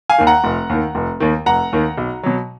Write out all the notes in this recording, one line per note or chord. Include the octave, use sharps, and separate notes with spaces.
F5 G#5
D#2 D#3
F#5 A#5
F1
D#2 D#3
F1
D#2 D#3
F1 F#5 A#5
D#2 D#3
B1
B2 F#3